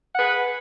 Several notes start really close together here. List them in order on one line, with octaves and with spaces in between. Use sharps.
F#5 B4 G#4